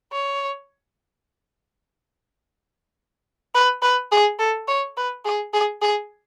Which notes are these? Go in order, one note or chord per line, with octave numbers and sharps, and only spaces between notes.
C#5
B4
B4
G#4
A4
C#5
B4
G#4
G#4
G#4